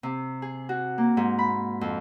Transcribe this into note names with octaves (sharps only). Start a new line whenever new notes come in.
C3
G#4
F#4
A#3
G#2
B5
F2